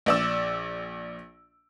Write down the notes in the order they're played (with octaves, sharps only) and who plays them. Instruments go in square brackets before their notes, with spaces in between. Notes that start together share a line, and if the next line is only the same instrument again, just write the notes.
[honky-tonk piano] A#1 D5 E6